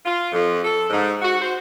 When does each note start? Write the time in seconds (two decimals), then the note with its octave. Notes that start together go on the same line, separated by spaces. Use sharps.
0.04 F4
0.32 F2
0.64 A4
0.90 G#2
1.22 F#4
1.42 C5